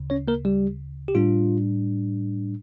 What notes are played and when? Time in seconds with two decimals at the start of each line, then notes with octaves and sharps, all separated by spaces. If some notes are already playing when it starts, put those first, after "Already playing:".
Already playing: D2 C#3
0.10 C#4 C#5
0.28 A#3 A#4
0.45 G3 G4
1.08 G4
1.15 A2 G3 D4 F4